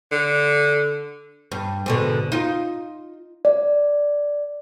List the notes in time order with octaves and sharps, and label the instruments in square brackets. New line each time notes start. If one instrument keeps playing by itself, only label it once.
[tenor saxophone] D3
[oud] G2
G#2 B2 D3
D#4 F4
[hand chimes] D5